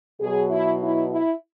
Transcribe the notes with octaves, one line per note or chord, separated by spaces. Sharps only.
B2 F#3 G#4
E4
E4
E4